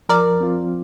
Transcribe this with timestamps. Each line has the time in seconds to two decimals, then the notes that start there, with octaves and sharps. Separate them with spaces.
0.09 F3 A#4 D5
0.41 C4 F4